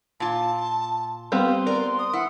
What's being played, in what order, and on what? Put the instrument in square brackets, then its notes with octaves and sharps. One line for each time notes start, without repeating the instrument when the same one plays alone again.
[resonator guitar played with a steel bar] A#2 F4 [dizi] A5
[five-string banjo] G3 B3 C4 [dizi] F5 [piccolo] C6
[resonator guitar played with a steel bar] A#4 [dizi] D5
[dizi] D#6
[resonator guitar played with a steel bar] E4 [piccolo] F#5